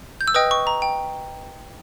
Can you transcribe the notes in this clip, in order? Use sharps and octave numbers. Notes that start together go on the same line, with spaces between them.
G6
E6
B4 D#5 G5 D#6
C#6
A#5
G5